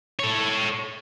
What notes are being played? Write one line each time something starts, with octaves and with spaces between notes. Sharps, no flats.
A4 C#5